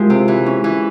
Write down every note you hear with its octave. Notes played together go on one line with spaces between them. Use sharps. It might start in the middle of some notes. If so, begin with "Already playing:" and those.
Already playing: F3 G#3 E4 G4 A#4
C3
E3
C#4
E3